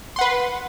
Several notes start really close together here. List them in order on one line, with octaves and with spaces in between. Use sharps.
C6 F#5 B4